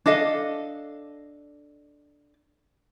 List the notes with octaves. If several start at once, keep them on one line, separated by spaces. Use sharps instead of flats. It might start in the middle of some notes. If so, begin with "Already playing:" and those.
D4 A4 D#5 F5